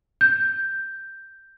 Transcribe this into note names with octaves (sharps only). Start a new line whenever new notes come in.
G6